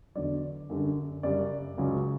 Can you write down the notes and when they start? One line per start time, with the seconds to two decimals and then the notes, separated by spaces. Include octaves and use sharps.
0.15 E2 D3 F#3 D5
0.70 F#2 D3 G3
1.23 F#2 C#3 G3 D5
1.78 C#2 C#3 F#3